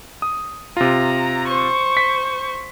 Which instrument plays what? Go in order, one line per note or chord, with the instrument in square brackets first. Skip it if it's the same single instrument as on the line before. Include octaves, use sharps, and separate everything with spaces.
[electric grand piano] D#6
[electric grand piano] C3 F4 [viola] A#5
[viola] C5 C#6
[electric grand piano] B6